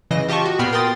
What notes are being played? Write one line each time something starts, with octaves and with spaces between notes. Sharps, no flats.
C#3 E3 D#5 A#6
F4 G4 D#5 A5 C#6
F#4
A#2 B3 G5 B5 F6 C7
A#4 G5 C6 D#6 A6